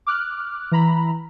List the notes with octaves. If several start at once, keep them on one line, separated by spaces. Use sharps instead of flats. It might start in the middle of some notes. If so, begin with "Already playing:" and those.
D6 F6 F#6
E3 A#5 B5